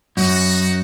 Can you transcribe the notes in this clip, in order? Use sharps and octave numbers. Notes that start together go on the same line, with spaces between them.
F#2 D#4 F#4